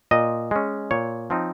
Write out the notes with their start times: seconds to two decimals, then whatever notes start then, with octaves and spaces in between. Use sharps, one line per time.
0.11 A#2 D#5
0.51 G#3 C#4
0.91 A#2 C#5
1.30 F3 C4 D#4